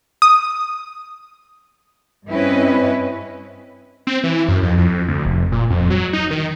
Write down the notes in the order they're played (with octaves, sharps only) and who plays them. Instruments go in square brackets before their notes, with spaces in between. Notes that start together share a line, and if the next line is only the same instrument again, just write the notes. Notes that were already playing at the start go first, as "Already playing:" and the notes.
[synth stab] D#6
[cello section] G2 C4 C#4 E4 B4 D#5
[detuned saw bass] C4
E3
F#2
F2
F2
D2
F1
A#2
F2
F#3
D#4
D#3